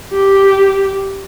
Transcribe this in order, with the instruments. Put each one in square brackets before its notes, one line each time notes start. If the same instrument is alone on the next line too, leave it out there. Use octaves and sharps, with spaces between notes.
[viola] G4